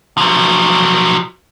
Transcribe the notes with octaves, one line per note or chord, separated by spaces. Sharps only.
F3 F#3